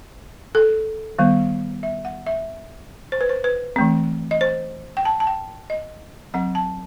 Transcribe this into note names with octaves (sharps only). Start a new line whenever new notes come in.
A4
D#3 G3 B3
E5
F#5
E5
C5
B4
C5
B4
E3 A3 C4
D#5
C5
G5
A5
A5
G5
D#5
F#3 C4 F#5
A5